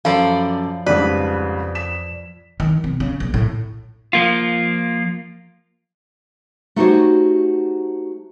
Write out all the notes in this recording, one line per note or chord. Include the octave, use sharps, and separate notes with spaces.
F#2 F3 A4 D5 F5 B5
F2 G#2 C#3 G3 B4 D5
B6 E7
D#3
C3
C#3
A#1
A2
F3 A#3 F4
A3 D#4 F#4 G4 C5 C#5